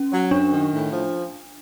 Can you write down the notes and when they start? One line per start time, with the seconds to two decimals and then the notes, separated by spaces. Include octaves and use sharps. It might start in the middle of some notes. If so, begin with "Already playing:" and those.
Already playing: C#4
0.11 F#3
0.31 F#2 D4
0.52 D#3
0.71 A2
0.91 F3